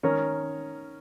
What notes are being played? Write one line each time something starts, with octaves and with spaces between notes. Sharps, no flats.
D#3 C#4 A#4 C#5